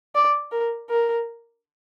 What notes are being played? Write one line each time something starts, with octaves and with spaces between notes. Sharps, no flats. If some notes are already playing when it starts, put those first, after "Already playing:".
D5
A#4
A#4